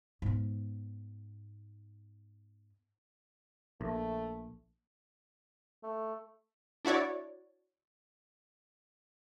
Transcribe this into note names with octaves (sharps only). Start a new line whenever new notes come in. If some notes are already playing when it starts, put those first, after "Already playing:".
G#2 B3
A#1 A3
A3
D4 E4 F#4 C#5 D5